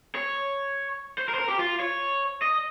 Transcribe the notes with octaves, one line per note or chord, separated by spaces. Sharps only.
C#5
C5
A#4
C5
A#4
G4
F4
C#5
D#5